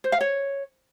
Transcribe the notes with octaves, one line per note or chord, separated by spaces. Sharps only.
C5
F5
C#5